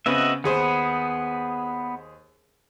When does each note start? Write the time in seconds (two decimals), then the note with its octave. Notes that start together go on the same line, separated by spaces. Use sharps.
0.06 C#3 B3 C4 F#4 D#5 E5
0.44 D#2 B3 G#4 C5